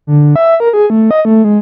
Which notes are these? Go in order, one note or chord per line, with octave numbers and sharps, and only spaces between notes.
D3
E5
A#4
G#4
A3
D#5
A3
G#3